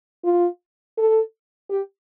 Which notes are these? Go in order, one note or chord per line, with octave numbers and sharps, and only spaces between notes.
F4
A4
G4